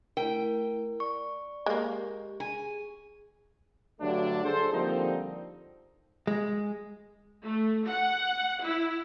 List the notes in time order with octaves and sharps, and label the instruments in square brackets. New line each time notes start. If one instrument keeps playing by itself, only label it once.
[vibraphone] A3 E4 [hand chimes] A#4 [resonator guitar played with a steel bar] G5
[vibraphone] D5 [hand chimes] C#6
[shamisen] G#3 A#3 [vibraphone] G4
[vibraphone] G#4 [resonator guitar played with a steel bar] G#5
[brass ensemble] G2 D3 F#3 A3 D4
G#4 A4 C5
D3 F3 G3 A#3 C4 D#4
[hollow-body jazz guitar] G#3
[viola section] A3
F#5
E4